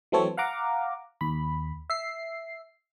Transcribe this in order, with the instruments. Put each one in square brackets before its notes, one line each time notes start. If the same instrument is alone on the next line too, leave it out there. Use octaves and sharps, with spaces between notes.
[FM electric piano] E3 F#3 A3 C4 A4 C#5
F5 F#5 A#5 D6
D#2 B5
E5 C7